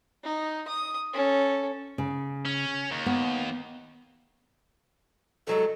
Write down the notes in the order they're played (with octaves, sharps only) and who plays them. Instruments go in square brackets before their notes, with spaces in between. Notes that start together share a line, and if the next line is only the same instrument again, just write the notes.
[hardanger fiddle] D#4
D#6
C#4 A4
[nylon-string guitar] C#3
[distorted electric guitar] C#4
D#2
[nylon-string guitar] B3
[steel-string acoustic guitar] G2 F#3 G#3 [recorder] A4